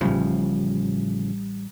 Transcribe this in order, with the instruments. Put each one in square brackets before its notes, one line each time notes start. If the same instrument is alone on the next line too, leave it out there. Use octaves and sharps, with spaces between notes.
[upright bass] A1 G3 [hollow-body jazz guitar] A2 C#3 F3